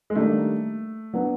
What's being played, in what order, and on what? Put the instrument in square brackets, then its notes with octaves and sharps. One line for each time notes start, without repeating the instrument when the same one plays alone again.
[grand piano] G#3
[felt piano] D#3 G3 A#3 D4 [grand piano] A3
[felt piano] F#3 B3 D4